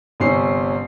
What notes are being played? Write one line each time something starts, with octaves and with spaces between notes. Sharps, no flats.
G1 C3 C#4 C7